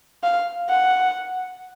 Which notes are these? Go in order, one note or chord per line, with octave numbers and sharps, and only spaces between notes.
F5
F#5